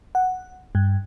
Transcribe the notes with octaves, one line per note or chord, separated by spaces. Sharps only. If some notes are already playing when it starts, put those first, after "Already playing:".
F#5
G2